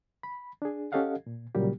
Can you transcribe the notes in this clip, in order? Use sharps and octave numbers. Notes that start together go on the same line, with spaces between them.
B5
D4 G#4
C#4 G4 A4 D#5 F5 F#5
A#2
A#2 C#3 F#3 G3 A#3 G4